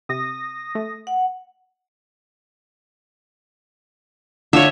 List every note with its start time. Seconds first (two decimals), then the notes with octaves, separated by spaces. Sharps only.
0.09 C3 D#6 A#6
0.75 A3
1.07 F#5
4.53 D3 F4 C#5 E5